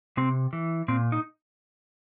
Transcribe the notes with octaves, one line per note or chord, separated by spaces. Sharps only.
C3 C4
E3
A#2 C4
D#4